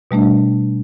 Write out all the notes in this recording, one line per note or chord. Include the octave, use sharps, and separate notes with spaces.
B2 G3 A3 D4